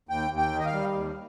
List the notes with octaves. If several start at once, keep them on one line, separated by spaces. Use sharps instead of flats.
D#2 G5
D#2
G5
D#3
D#5
F5
G3
D#2